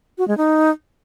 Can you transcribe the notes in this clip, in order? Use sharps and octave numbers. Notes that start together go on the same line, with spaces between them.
F#4
G#3
D#4